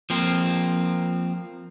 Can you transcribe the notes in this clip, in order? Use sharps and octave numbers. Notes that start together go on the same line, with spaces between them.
F3 A#3 C4